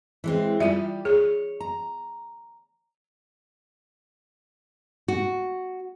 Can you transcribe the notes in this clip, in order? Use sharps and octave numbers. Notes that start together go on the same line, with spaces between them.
E3 G#3 C4
G3 F4 G4 E5
G#4 C#5
A#5
F#4